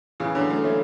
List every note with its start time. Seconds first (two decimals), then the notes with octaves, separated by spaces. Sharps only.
0.20 C#3 E3
0.35 D3 F#3
0.50 F#3 A3
0.64 A3 C#4